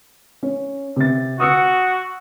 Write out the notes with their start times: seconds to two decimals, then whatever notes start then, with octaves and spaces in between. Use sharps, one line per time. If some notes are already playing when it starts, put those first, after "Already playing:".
0.43 C#4
0.96 C3 A6
1.40 F#4 D#6 E6 C#7